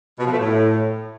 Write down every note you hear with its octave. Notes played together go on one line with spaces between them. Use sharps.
B2
F3
A3
A2